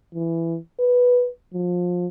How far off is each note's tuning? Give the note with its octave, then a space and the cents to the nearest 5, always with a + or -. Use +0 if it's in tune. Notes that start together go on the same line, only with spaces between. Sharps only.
E3 +10
B4 -5
F3 +25